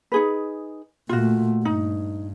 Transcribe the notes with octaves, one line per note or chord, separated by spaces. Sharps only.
D#4 G#4 B4
A#2 A3 F4 F#4
G2 D#4